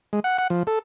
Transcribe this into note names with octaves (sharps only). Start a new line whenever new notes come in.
G#3
F#5
F#5
F3
A4